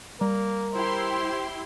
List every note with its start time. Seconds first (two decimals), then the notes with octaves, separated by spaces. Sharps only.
0.21 G3 A#3 A#4
0.74 E4 G4 C5 C6